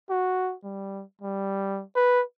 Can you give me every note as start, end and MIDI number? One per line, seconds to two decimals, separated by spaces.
0.10 0.55 66
0.64 1.03 55
1.21 1.83 55
1.96 2.23 71